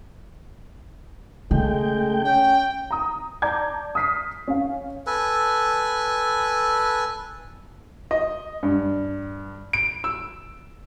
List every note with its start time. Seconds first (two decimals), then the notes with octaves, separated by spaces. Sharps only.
1.51 C#3 G#3 A3 G5
2.25 C#4 G5
2.91 A#5 D#6
3.42 D5 A5 A#5 D6 G6 G#6
3.95 D#6 F6 B6 C7
4.48 C#4 F5
5.07 A4 B4 G#5
8.11 D#5
8.63 G2
9.73 D7
10.04 E6